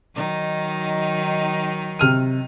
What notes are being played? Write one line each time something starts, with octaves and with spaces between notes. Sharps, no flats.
D#3 F#3 D#4
C3 F6 D#7